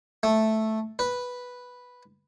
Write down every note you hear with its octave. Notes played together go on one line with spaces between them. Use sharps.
A3
B4